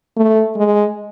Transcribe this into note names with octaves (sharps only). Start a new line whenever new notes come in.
A3
G#3